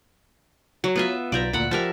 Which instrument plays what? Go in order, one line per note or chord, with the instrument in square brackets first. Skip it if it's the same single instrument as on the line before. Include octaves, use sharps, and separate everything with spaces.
[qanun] F#3 [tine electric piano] F#4 C#5
[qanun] B3 F4 E5
[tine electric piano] B1 F4 G6 [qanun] D5 E5 A#5
[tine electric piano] D2 A#2 [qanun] F#5 B5
[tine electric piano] F3 G4 [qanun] A#4 E5 A5